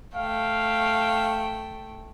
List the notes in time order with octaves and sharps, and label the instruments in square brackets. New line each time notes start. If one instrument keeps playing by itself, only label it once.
[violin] A3 G5 [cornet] F5